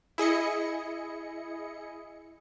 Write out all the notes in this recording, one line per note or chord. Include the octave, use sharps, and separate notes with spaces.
E4 G#4 D#5 C#7